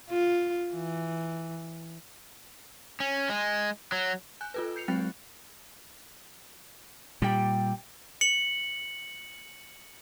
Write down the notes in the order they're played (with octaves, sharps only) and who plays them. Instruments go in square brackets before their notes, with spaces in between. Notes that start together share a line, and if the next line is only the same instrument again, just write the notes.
[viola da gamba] F4
E3
[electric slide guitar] C#4
G#3
F#3
[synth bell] G#5 F#6 G6
F4 A4 B4
G6 C7 C#7 F7
F#3 G#3 C4 G5 F#6 A6
[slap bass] A#2 G3 [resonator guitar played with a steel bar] G4 G5
[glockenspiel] C#7 F#7